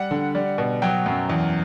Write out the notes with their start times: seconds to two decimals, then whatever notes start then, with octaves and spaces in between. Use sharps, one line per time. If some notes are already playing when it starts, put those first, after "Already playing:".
Already playing: G3 F#5
0.11 D3
0.35 G3
0.58 B2
0.82 F#3 G5
1.06 F#2
1.29 E2